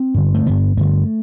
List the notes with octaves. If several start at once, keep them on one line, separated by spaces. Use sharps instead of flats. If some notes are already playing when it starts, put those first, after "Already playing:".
Already playing: C4
G2 D3
A3
G2 D3 B3
G2 D3 A3